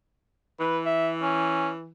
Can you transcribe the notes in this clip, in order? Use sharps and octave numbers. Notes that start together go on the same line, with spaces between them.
E3 B4
E5
C#4